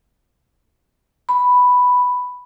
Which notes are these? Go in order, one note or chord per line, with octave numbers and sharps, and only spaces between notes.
B5